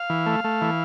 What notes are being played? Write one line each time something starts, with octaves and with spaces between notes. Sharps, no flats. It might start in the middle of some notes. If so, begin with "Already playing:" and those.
Already playing: F5
E3
A3
A3
E3